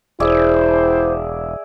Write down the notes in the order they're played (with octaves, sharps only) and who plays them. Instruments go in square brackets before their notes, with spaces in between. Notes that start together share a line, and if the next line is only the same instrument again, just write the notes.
[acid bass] E1 [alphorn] E4 [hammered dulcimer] G#4 D5 E5 [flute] C5